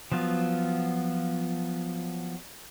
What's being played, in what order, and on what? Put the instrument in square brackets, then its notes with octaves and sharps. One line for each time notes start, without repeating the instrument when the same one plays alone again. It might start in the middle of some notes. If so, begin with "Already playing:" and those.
[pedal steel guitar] F3 F#3 B3 F4